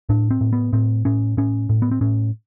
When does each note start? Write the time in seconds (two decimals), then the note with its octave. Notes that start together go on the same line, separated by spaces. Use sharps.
0.09 A2 D4
0.31 C4
0.41 A2
0.53 B3
0.73 A2 C4
1.05 A2 C#4
1.37 A2 C#4
1.69 A2
1.82 B3
1.91 C4
2.01 A2 C#4